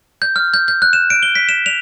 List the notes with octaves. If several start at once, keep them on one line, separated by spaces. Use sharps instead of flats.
G6
F6
G6
G6
F#6
E7
D7
G7
B6
E7
F7